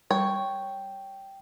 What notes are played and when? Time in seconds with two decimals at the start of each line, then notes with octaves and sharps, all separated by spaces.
0.11 G3 C#5 G5